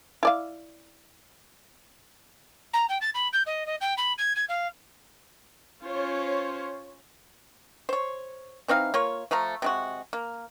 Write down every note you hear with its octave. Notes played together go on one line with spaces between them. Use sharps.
E4 D5 F5
A#5
G5
A6
B5
G6
D#5
D#5
G5
B5
G#6
G#6
F5
C#4 F4 C5 C#5
C5 C#5
E3 C4 D#4 F5
A#3 F4 C#5
F3 A3 F5 A#5
C3 G#3 F#4
A#3